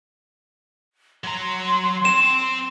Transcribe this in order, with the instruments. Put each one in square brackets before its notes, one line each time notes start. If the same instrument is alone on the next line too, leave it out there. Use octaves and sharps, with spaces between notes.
[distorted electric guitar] F#3 A#5 [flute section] C6
[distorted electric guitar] C4 [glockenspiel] E7